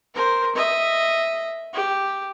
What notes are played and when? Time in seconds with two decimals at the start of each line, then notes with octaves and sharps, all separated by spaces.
0.14 A#4 C5
0.55 D#5 E5
1.73 G4